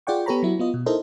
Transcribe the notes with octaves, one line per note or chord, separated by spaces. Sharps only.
F4 G#4 D5 F#5 G5 C#6
B3 G4 A4 C#5 A#5 B5
F#3 E4 F#4
B3 F4 D#5
B2
D#4 E4 A4 A#4 C5 D#5